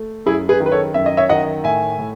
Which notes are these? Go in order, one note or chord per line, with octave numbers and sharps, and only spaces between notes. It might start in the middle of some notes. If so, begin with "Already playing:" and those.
Already playing: A3
F#2 E4 G#4
G#4 B4
D#3
B4
A4 C#5
F#2 E5
D#5
C#5 E5
D#3 D#5 F#5
A2 E5 G#5
A2